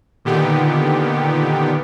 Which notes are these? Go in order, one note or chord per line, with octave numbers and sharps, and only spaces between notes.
A#2 D3 D#3 B3 G4